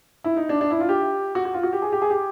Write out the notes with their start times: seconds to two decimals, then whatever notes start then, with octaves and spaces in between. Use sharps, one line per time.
0.24 E4
0.37 D#4
0.49 D4
0.61 D4
0.71 E4
0.80 F4
0.89 G4
1.35 F#4
1.45 F#4
1.54 F4
1.63 F#4
1.73 G4
1.82 G#4
1.92 G4
2.02 G#4
2.10 G4